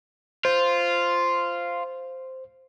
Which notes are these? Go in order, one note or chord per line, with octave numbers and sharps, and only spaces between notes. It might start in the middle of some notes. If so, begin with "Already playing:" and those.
F4 C5